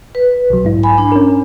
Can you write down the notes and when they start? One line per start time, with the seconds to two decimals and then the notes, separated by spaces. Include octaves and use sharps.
0.15 B4
0.50 B1 F#3
0.65 G#2 E4
0.83 G#5 B5
0.98 D4
1.12 C#4 A#4